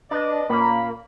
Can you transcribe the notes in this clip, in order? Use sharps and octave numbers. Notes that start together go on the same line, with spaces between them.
D4 B4 D5 D#5
A#2 A#3 C#4 B5